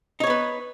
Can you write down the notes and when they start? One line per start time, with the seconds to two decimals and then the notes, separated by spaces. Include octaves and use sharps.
0.20 D#4
0.24 C#5
0.27 B3
0.30 B4